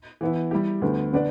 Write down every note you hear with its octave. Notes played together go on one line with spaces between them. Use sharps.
E3 B3 E4
G3 E4 G4
D2 D3 B3
D3 B3 D4 B4 D5